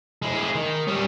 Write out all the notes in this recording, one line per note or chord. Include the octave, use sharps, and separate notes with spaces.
G#3 E4
D#3
G3 C#4